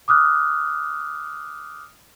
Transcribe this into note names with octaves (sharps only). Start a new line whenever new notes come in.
D6 D#6 F6 F#6